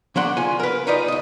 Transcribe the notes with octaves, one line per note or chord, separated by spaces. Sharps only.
F3 A3 A#3 D4 F#5 C6
A#3 F4 G#5
A#4 B4
D#4 F4 B4 D5 D#5
C#2 D#5